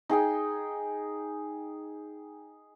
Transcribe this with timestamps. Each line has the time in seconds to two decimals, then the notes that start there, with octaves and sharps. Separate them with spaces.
0.09 D#4 G#4 G5 G#5